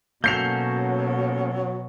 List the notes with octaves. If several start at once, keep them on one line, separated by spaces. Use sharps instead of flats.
B2 F#3 A#3 C#4 A4 G6 C7 F7